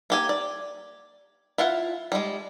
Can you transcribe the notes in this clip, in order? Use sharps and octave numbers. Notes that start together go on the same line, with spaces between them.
A#3 G4 G#5
D5
E4 F4 F5 F#5
G3 G#3